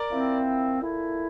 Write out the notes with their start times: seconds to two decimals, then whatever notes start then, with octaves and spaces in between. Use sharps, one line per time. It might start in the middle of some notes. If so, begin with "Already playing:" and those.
Already playing: A#4 D5
0.09 A#2 F3 C4 E4
0.81 A#2 A3 E4